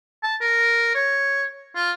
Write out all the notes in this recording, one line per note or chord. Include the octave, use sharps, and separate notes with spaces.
A5
A#4
C#5
F4